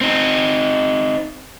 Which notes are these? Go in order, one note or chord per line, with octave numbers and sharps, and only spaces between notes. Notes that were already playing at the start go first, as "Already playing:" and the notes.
C4 D#4